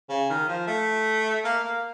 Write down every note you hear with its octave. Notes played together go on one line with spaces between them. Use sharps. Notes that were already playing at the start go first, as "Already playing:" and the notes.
C#3
D#3
F3
A3
A#3
A#3